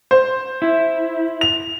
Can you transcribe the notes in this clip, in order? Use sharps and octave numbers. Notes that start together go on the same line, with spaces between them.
C5
E4
F7